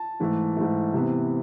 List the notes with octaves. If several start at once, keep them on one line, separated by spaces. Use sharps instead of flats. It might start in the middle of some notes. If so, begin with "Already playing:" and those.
Already playing: A5
G#2 E3 A3
G#2 E3 A3
C3 E3 B3